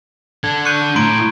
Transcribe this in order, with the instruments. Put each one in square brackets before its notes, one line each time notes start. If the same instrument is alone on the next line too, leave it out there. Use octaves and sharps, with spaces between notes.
[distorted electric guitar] D4 A4 [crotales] G#6
[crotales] C#6 F#6 D#7 [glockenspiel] G6 C#7
[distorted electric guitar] A2 [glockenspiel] A#5 C6 D7